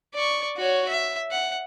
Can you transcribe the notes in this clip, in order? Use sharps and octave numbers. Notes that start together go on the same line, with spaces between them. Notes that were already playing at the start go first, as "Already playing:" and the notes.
D5 C#6
F#4 C#5
E5
F#5